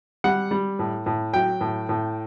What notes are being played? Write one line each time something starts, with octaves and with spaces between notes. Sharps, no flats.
G3 F#5
G3
A2
A2
F#3 G5
A2
A2